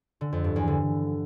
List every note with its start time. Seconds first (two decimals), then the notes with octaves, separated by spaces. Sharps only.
0.21 D3
0.33 F2
0.44 G2
0.56 E2
0.68 D3